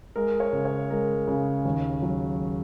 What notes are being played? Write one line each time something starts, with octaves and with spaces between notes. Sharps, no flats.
G#3 A#4
C#5
C#3
C#5
G#3 A#4
C#3
D#2
F#3